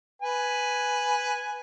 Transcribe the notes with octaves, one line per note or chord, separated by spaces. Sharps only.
B4 G#5